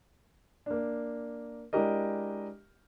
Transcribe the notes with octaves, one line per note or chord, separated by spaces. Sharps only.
A#3 D4
G#3 D4 E4 G4 A#4 D#5